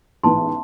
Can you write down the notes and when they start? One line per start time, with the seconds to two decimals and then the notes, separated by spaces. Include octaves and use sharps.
0.23 A1 G#2 E3 B3 A5 C6